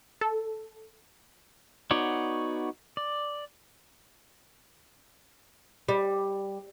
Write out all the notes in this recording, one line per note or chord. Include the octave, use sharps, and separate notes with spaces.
A4
B3 D#4 F#4 C#5 D5
D5
G3